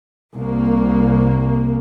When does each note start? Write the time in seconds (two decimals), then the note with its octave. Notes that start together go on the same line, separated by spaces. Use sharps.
0.33 C2 A#3